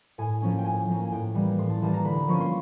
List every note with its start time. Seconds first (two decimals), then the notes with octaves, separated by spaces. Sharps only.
0.18 A2 G#5
0.42 F3 A#3 C#4
0.58 G5
0.65 A2 G#5
0.88 F3 A#3 C#4
1.05 G#5
1.11 A2 G5
1.34 E3 G3 A#3
1.58 A2 C6
1.70 A5
1.82 E3 G3 A#3 A5
1.93 A#5
2.05 D3 B5
2.28 F3 A#3 C#4 C#6
2.40 C6